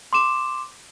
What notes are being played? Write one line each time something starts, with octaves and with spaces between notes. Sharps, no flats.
C6 D6 E7